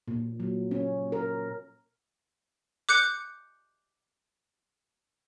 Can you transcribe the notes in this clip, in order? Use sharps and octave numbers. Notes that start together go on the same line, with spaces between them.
A#2
F#3
C#4
A#4
D6 F#6 G6 C#7